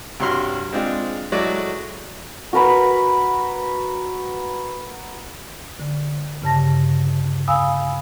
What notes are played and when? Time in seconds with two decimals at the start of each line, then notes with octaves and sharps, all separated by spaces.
0.20 C2 G2 F#4 C#5 C6 F6
0.73 G#3 C4 D4 F4
1.32 F#3 G#3 A3 E4 F#4 D5
2.53 F#4 A#4 B4 B5
5.80 D3
6.42 G2 C#3 A5 A#6
7.48 F5 G#5 B5 D#6 E6